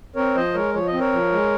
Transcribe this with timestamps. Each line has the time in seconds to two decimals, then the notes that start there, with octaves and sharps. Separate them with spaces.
0.16 C4 A#4 C#5
0.35 F3 C5 D#5
0.54 G#3 A#4 C#5
0.74 F3 C#5
0.87 D#5
0.93 C4
0.99 A#4 C#5
1.12 F3
1.32 G#3